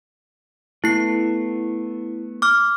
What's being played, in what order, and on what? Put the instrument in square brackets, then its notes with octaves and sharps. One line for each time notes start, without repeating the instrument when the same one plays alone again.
[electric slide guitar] A3 B3 [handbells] E4 C7
[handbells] D6 F6